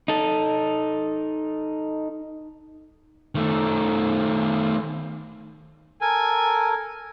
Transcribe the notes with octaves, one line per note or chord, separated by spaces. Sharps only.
D#4 A4
D#3 A3
A4 A#4 G#5